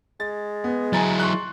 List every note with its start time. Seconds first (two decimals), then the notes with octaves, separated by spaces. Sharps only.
0.20 G#3 A6
0.64 B3
0.93 F#3 E4 G#5 A#5 A6
1.19 C6 C#6 F#6